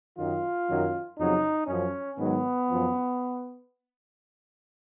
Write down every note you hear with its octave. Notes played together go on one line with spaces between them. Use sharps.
F#2 D#3 F#3 F4
F#2 D#3 F#3
F2 C#3 F#3 D#4
F#2 F3 C#4
G#2 D#3 F#3 B3
F#2 F3